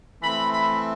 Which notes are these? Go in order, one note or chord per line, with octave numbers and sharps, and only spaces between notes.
E3 A3 C4 B5
B5